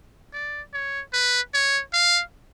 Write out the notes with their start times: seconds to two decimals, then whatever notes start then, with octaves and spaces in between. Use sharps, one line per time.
0.33 D5
0.73 C#5
1.13 B4
1.54 C#5
1.93 F5